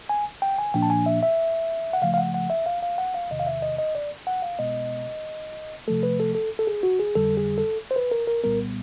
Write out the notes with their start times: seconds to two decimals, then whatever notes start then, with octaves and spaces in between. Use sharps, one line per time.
0.09 G#5
0.42 G5
0.58 G#5
0.74 A#2 F3 A#3 D4 G5
0.82 A5
0.90 G#5
1.06 E5
1.23 E5
1.93 F#5
2.02 C#3 F3 A3 F5
2.14 F5
2.18 F#5
2.34 F#5
2.50 E5
2.66 F5
2.83 F5
2.98 F#5
3.14 F5
3.31 E2 C3 D#3 D#5
3.39 F5
3.47 E5
3.62 D#5
3.78 D#5
3.95 D5
4.27 F#5
4.42 F5
4.59 B2 G#3 B3 D#5
5.88 C3 F3 A3 A4
6.03 B4
6.20 A4
6.35 A4
6.59 A4
6.67 G#4
6.83 F#4
7.00 G#4
7.15 F2 D3 G3 A4
7.37 G#4
7.58 A4
7.91 C5
7.96 B4
8.11 A#4
8.27 A#4
8.44 C2 A#2 G3 B3 A#4